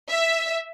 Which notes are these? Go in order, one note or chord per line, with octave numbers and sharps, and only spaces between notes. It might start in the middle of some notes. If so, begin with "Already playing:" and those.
E5